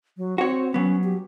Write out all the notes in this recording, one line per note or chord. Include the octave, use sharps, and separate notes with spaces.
F#3
C4 F#4 C#5
F#3 B3 C#4
G4